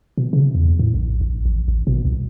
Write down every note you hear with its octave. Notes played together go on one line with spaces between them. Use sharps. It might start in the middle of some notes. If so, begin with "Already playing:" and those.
B2
C#3
E2
A2
A#1
A#1
A1
A1
B2
C2